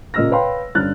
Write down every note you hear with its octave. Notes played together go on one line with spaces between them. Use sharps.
A#2 C#3 D#5 E6 F6 A#6
B4 C#5 F5 G5 B5 C6
G2 D3 C#4 F6 F#6 A6